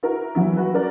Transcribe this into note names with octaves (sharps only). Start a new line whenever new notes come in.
E4 F#4 A#4
E3 F#3 G3 E4
F#4 B4
C#4 F#4 A#4 D5